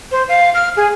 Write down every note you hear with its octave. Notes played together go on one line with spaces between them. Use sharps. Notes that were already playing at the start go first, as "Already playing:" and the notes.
C5
F5
F6
G#4